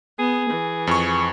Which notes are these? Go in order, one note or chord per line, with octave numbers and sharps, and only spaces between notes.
B3 G#4
E3
F2 C#6